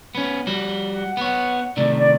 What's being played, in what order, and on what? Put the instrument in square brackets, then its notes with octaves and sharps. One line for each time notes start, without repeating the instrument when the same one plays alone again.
[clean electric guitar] B3 C#4
G3 F#4
[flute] F#5
[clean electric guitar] B3 C#5 [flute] F#5
[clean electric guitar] C3 D#3 A3 [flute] D5
[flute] D5